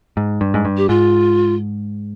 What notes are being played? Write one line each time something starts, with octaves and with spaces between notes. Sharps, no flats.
G#2
G2
G#2
G2
G4
G#2 F4